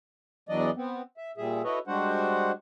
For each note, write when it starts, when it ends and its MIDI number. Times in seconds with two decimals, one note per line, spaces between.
0.49 0.71 40
0.49 0.71 52
0.49 0.71 54
0.49 0.71 62
0.49 0.71 74
0.49 0.71 75
0.76 1.02 59
0.76 1.02 60
1.17 1.31 76
1.38 1.62 46
1.38 1.62 55
1.38 1.62 68
1.38 1.62 76
1.64 1.79 64
1.64 1.79 66
1.64 1.79 69
1.64 1.79 71
1.64 1.79 73
1.64 1.79 75
1.87 2.52 55
1.87 2.52 56
1.87 2.52 62
1.87 2.52 66
1.87 2.52 72
1.87 2.52 78